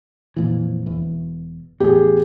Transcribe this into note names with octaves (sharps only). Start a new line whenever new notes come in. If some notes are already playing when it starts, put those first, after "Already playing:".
F2 A#2 E3
E1 E2
A1 E2 G4 G#4